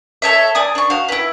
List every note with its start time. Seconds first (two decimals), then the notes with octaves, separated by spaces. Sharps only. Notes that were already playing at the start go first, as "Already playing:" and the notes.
0.22 A4 C#5 E5
0.55 D5 G#5 D#6
0.75 D4 C#6
0.90 F#4 F5
1.08 E4 B4